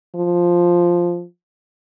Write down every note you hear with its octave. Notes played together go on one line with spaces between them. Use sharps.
F3